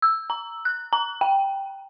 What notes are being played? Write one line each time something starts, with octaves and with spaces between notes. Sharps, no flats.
E6
A#5
F#6
A#5
G5